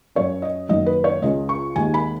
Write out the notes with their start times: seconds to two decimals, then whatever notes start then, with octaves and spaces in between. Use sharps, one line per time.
0.15 F#2 F#3 C#4 C#5
0.42 D#5
0.69 F#1 F#2 D#3 F#3 D#5
0.86 B4
1.04 C#5
1.22 C#2 C#3 G#3 C#4 D#5
1.49 C#6
1.76 D#2 D#3 G#3 D#4 G#5
1.94 B5